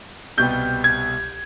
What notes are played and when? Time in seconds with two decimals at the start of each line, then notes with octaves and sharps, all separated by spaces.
0.38 C2 B2 G3 G6
0.84 G#6